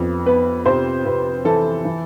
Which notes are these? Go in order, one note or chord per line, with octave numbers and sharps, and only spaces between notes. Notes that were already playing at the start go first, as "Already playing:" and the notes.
Already playing: F2 B3
B3 B4
C3 C5
C3 B4
E3 A4
E3